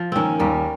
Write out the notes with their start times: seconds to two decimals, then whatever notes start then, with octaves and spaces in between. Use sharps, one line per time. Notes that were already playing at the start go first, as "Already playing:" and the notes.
Already playing: F3
0.12 D#3 A#3 C4 C#4
0.40 D#2 G3 A#3